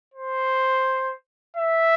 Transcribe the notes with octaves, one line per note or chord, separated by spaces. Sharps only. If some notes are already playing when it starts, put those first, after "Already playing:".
C5
E5